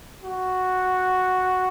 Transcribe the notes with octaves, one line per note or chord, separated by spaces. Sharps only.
F#4